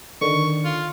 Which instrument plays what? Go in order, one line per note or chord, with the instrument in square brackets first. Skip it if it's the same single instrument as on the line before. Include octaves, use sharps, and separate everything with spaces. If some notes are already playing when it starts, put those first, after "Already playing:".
[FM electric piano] D3 D#3 [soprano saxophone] C#6
[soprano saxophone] F4